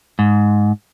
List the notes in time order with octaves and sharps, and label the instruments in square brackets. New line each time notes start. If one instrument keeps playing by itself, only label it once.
[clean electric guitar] G#2